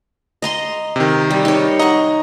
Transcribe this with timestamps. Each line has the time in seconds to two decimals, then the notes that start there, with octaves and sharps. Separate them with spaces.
0.42 D#5 A#5 C6
0.96 C3 D#3
1.31 G3
1.45 D#4 C#5
1.79 D#5 F#5 A#5 C#6